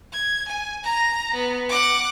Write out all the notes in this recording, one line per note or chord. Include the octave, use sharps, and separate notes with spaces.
G#6
G#5
A#5
B3
F#5 D6